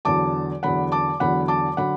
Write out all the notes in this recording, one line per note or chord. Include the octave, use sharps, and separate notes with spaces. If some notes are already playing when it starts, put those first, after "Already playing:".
E2 D3 F#3 A5 D6
E2 D3 F#3 F#5 B5
A5 D6
E2 D3 F#3 F#5 B5
A5 D6
D3 F#3 F#5 B5